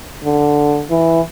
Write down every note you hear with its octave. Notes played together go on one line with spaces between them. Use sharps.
D3
E3